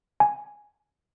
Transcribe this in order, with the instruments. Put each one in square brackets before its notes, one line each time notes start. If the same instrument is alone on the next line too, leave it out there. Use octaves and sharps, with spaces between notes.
[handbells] G#5